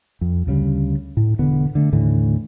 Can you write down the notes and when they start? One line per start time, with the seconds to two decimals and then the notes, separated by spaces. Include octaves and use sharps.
0.21 F2
0.47 D2 C#3 G3
1.17 A2
1.39 E1 D3 B3
1.75 D3 A3
1.92 D#2 A2 D3 E3